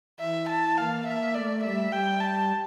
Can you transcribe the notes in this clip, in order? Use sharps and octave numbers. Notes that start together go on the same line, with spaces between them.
E3 E5
A5
A#3 F5
A#3 E5
A3 D5
G3 E5
G3 G5
A5